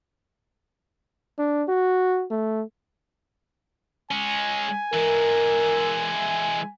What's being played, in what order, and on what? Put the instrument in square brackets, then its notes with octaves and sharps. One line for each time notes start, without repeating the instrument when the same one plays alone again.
[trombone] D4
F#4
A3
[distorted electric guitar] G#3 C#4 [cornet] G#5
[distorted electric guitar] E3 G#3 [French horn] A#4